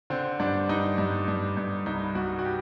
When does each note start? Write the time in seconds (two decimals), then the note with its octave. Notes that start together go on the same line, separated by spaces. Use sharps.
0.10 D3 C4
0.39 G2 D4
0.69 G2 D#4
0.98 G2
1.28 G2
1.57 G2
1.86 C2 D#4
2.15 C2 F#4
2.39 F#4
2.45 G4